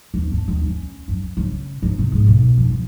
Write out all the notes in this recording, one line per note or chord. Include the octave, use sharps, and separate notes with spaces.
D#2
D4
D#2
C#4
F#2
C#3
C#3
C3
G#2
B1
F2
F3